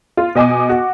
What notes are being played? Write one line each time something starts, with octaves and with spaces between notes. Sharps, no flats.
F4
B2 D#5 G#5 D6
F#4